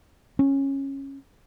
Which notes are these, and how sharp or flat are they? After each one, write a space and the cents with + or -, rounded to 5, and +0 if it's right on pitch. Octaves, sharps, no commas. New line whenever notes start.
C#4 -15